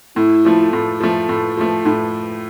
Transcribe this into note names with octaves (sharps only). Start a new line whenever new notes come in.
A2 E4
F3 A3
A2
F3 A3
A2
F3 A3
A2 D#4